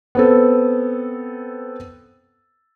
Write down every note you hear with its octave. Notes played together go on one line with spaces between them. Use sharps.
B3 C4 A4